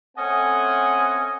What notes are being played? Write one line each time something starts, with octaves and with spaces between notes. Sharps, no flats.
A3 C4 C#4 D#5 F#5 G#5